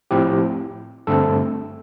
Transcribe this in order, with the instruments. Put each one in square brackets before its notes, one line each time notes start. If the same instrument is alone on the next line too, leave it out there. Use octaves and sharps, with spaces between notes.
[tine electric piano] A2 F3 C4 E4 G4
G2 D3 A3 C4 A4